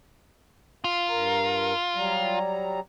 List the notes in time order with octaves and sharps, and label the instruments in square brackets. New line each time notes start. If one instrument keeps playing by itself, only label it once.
[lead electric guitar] F4 [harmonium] F5
[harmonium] G2 A#4 A#5
F#3 G3 A#5